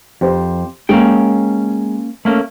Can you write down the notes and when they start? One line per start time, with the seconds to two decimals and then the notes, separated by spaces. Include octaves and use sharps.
0.21 F2 G4 C5
0.89 G#3 A#3 C#4 G5
2.25 A3 A#3 C#4